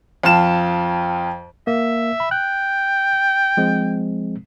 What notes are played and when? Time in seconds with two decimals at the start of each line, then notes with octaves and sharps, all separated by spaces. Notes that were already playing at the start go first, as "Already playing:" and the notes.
0.23 F2 F4 A5 E7
1.67 A#3 E5
2.20 B5
2.31 G5 F#6
3.57 F3 G#3 C4